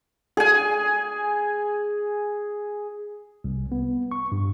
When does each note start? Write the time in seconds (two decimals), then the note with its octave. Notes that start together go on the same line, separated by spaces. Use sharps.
0.37 G#4 G#5
3.44 C2
3.72 B3
4.12 C#6
4.32 G2